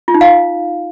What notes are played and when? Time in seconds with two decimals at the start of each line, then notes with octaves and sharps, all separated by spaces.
0.08 F4
0.14 D#4
0.21 F5